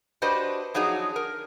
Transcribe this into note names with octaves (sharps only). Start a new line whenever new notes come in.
D4 F#4 G4 B4 C5 D#5
F3 F#3 D4 D#4 F#4 G#4
A#4